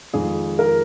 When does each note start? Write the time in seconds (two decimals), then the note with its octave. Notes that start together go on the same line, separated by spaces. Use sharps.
0.13 F2 D#3 G#3 G#4
0.59 A#4